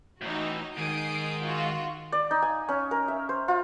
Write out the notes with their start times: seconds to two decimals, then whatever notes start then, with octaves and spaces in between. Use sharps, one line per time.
0.21 A2 E3 D#4 F#4
0.77 G#2 D#3 G#4 D#6 C7 D7
1.43 F4 F#4
2.12 D5
2.31 D#4
2.42 G#5
2.69 C#4
2.91 A#4
3.08 E5
3.29 C5
3.48 F4